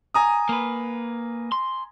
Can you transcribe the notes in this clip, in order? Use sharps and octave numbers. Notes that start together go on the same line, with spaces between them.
G#5 A#5 D#6
A#3 B4
C6